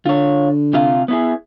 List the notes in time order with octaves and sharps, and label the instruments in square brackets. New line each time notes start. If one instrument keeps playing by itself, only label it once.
[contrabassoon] D3 [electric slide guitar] F4 C#5
[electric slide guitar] C3 F4 F5
B3 E4 G#4